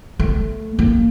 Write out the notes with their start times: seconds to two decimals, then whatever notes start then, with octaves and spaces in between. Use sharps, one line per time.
0.19 A3
0.79 A#3